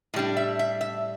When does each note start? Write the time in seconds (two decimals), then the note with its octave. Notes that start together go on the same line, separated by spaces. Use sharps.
0.14 A2 G3 D4
0.37 E5
0.59 E5
0.81 E5